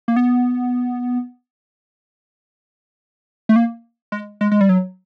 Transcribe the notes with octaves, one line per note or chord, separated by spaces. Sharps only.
A#3
B3
A3
A#3
G#3
G#3
G#3
G3
F#3